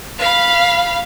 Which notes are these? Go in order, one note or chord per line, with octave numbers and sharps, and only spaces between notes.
F5 B5